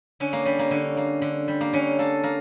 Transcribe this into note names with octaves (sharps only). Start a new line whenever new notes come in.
D3 C#4
A#3
G3 C#4
A#3
D3 C#4
A#3
D3
G3
A#3
D3 C#4
A#3 A4
A#3 A#4